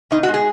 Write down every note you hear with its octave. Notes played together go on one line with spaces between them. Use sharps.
B2 D#4
F#4
G#3
G#4